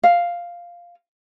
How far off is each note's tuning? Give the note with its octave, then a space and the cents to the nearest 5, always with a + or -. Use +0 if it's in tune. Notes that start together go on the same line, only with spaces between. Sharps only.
F5 +0